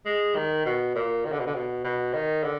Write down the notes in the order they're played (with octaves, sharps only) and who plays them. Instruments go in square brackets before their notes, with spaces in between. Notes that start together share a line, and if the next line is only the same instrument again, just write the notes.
[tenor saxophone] G#3
D#3
B2
A#2
D#3
D3
B2
D3
B2
B2
D#3
D3